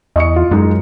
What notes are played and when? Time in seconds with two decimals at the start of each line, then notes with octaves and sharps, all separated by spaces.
0.16 E2 D#5 C#6 C#7
0.36 F4
0.51 F#2 G#3 D#4 G#4